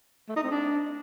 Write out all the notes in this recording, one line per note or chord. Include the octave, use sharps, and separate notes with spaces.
A3
D#4
C4
D4